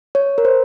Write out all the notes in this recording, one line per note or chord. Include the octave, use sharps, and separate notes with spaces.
C#5
A#4
C5